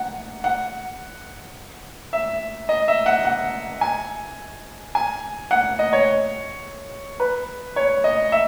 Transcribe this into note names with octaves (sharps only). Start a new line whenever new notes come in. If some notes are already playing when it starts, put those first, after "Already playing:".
Already playing: F#5
F#5
E5
D#5
E5
F#5
F#5
G#5
G#5
F#5
D#5
C#5
B4
C#5
D#5
E5